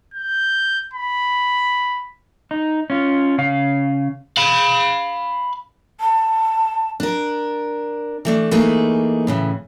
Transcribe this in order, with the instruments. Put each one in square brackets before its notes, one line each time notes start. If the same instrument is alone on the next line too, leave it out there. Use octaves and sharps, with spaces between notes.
[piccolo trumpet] G6
B5
[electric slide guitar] D#4
C#4 F4
C#3 F5
[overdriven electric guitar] F5 B5
[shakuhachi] A5
[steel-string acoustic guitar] D4 A#4
E3 A3 D4
E3 A3 A#3 D#4 G#4
A2 C#3 E3